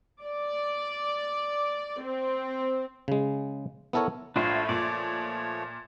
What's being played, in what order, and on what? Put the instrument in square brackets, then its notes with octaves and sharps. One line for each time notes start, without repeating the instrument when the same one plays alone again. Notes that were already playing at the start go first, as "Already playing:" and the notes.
[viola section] D5
C4
[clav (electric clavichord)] C#3 G#3
B3 E4 A4 A#4 C#5
[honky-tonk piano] A#1 A2 [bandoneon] F3 A3 C#5 [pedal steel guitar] D4 F4 C5
[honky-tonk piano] A#2 [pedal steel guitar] D5